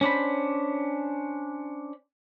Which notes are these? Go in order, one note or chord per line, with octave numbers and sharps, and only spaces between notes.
C#4 D4 C5 B5